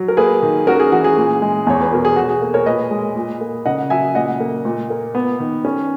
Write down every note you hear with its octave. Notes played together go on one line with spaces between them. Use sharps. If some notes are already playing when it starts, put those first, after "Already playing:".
Already playing: F#3
A#4
A#3 G#4 B4
D#3
C#4 F#4 A#4
G#4
E3 F#4
G#4
A#2
G#3
E2 C#5
B4
B2 A#4
G#4
B2 F#4
G#4
A#3
A#4 C#5
A#2 B4 D#5
G#3
A#2
A#3
C#3 D#5 F#5
F#3 E5 G#5
A#2 D#5 F#5
A#3
A#2
A#3
B3
D#3
C#4